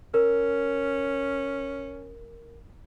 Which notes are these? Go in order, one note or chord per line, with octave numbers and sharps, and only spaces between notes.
C#4 A#4